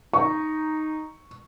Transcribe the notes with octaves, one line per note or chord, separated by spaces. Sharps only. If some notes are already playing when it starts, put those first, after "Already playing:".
D#4 C#6